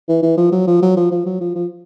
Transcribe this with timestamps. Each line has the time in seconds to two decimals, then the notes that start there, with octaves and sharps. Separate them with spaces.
0.09 E3
0.23 E3
0.37 F3
0.52 F#3
0.67 F3
0.82 F#3
0.97 F3
1.12 F3
1.26 F#3
1.41 F3
1.56 F3